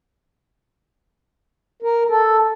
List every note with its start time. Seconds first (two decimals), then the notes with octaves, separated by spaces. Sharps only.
1.82 A#4
2.09 A4